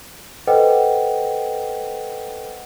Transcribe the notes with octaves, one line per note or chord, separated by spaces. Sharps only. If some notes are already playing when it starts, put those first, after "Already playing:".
A4 B4 C5 D#5 F#5 G5